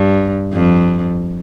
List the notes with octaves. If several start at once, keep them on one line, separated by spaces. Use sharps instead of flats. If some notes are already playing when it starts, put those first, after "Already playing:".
Already playing: G2
F2